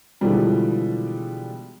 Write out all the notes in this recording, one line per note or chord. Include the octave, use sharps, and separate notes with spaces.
B2 D3 E3 F3 G3 G#3